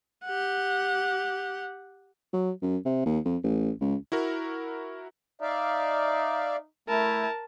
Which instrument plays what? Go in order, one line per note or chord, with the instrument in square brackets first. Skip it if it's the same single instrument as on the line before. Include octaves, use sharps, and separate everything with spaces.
[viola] G4 F#5
[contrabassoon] F#3
F#2
C3
D#2
F2
A1
C#2
[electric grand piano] E4 F#4 A#4
[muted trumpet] D#4 [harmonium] D5 E5 F5
[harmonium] A3 [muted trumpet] E4 [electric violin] A#4 A5